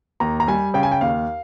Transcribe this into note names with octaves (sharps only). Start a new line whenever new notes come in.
D#2 A#5
A#5
G3 G#5
C#3 G5
G#5
G5
D#2 F5